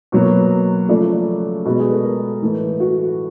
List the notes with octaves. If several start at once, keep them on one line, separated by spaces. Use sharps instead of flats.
B2 F#3 A#3
C#3 F3 A3 D5
B2 G#3
G#4
A4
A#4
A2 E3 A3
F#4